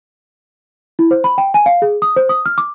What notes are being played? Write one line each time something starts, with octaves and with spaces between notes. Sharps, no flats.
E4
C5
B5
G5
G#5
F5
G#4
D#6
C5
D#6
F6
D6